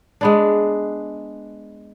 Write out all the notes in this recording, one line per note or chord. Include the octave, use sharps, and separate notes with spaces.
G#3 B3 D4